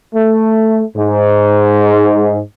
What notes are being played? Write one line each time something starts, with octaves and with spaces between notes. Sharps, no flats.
A3
G#2